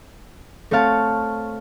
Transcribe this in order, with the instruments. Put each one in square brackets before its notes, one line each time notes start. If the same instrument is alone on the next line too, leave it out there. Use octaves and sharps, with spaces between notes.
[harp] A3 C4 C#5 F5 A5